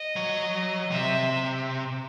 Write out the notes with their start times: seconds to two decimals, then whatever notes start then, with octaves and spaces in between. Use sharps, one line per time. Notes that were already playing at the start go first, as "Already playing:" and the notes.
Already playing: D#5
0.16 F#3
0.91 C3 E5